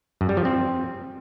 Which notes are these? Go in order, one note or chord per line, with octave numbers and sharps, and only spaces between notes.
F#2
G3
F3
C4